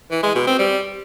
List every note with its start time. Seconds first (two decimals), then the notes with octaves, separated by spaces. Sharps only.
0.12 E3
0.23 G#3
0.35 B2
0.47 C4
0.59 G3